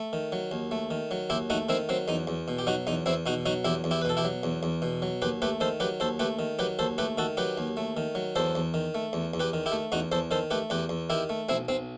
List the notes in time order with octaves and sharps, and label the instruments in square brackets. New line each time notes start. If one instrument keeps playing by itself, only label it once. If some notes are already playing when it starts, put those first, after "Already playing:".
Already playing: [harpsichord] A3
D#3
F#3
D#2
A3
D#3
F#3
D#2 E4 G4
A3 D#4 F#4
D#3 C4 E4
F#3 C4
E2 D#4
E2
B2
G4
F#3 D#4 F#4
E2 D#4
E2 C4 E4
B2 D#4 F#4
F#3 D#4 F#4
E2 E4 G4
E2
E4 G4
B4
B2 A4
E4 G4
F#3
E2
E2
B2
F#3
D#2 G4 B4
A3 G4 B4
D#3 A4 C5
F#3 G4 B4
D#2 A4 C5
A3 G4 B4
D#3
F#3 G4 B4
D#2 A4 C5
A3 G4 B4
D#3 F#4 A4
F#3 G4 B4
D#2
A3
D#3
F#3
E2 A4 C5
E2
D#3
A3
E2
E2
G4 B4
D#3
E4 G4
A3
E2 D#4 F#4
E2 A4 C5
D#3 A4 C5
A3 G4 B4
E2 G4 B4
E2
D#3 E4 G4
A3
B1 C4 E4
B1 C4